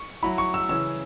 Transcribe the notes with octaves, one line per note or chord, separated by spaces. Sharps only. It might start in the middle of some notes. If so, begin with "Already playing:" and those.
Already playing: C#6
F#3 E4 B5
C#6
E6
C#3 E3 C#4 E6